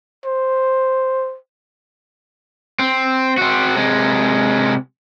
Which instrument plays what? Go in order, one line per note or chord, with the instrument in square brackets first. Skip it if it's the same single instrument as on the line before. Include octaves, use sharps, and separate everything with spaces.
[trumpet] C5
[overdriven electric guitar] C4
C4 F#4
C3 G#3